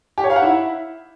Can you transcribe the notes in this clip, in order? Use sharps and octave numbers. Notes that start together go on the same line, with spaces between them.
G4
C#5
F5
F#5
E4